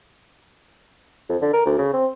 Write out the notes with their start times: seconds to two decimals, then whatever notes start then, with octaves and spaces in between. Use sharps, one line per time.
1.29 F2
1.42 D3
1.53 A#4
1.66 D2
1.79 C#3
1.93 C4